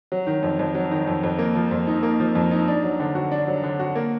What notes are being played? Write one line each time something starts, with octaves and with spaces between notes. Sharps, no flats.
F#3
D#3
F2
F2
F#3
D#3
F2
F2
A#3
F3
F2
D#4
A#3
F3
F2
D#4
D4
F#3
D3
F#4
D4
F#3
D3
F#4
A#3